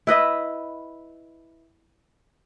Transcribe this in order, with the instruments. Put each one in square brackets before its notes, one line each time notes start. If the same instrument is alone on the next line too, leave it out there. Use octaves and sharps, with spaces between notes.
[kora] E4 B4 D#5 E5